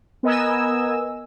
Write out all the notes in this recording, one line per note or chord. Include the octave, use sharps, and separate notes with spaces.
B3 A#4 D#5 G#5 E6